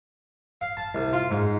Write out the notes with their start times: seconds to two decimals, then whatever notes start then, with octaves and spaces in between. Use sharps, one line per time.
0.61 F5
0.77 A5
0.95 C2
1.13 F4
1.31 G#2